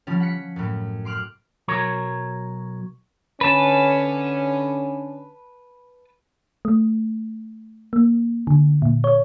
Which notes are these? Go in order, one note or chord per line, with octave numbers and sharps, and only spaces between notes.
F3 G3 C#4
F#5 B6 C#7
F#2 A2
C6 D6 F6 F#6
B1 F#3 A#4 C#5
D3 C#4 B4 A5
A3
A#3
D3
A#2
C#5